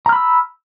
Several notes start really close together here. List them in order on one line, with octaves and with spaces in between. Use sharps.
A#5 F6 B5 E6